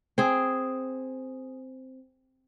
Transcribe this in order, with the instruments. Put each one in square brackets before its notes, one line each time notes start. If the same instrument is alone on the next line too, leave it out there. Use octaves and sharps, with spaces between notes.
[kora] C4 G#4